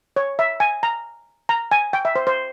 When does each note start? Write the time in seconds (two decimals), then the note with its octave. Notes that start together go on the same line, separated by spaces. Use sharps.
0.16 C#5
0.39 E5
0.60 G#5
0.83 A#5
1.49 A#5
1.71 G#5
1.93 G5
2.05 E5
2.16 C5
2.27 C5